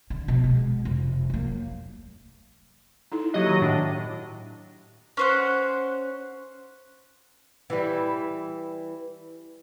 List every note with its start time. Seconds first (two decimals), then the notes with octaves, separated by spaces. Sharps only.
0.10 D3
0.28 B2 F3
0.44 G#3
0.85 F1
1.30 F#3 A#3
3.12 D#4 E4 A4
3.34 F#3 A#3 F#4 G4 D#5
3.46 D#3
3.61 A2 D4
5.17 C#4 C5 F#5
7.70 E3 G3